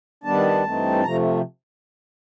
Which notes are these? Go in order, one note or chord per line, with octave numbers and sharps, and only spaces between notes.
D#3 G3 B3 D4 A5
G2 E3 A3 C4 D#4
C3 F3 A3 A#5